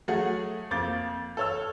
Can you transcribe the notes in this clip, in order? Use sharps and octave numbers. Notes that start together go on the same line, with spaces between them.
F#3 A3 F#4 G#4 F#5
F2 A#3 D6 G6 A6
A4 C#5 E6